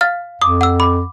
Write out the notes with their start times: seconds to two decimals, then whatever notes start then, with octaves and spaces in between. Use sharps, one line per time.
0.01 F5 F6 A6
0.42 F2 D6 D#6
0.61 F#5 E6
0.80 B5 D6